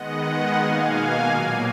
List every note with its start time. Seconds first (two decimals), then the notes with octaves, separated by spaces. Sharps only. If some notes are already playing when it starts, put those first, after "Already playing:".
Already playing: D#3 G#3 B3 D#5 F#5
0.20 D#5 F#5
0.55 B2 A#3 F5 G#5
1.25 A#2 F#3 A#3